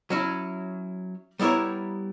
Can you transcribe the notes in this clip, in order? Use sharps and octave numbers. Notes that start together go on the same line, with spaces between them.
F#3 C#4 E4
G3 B3 E4 A#4 C#5